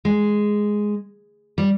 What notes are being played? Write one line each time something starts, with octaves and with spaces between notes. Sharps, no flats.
G#3
G3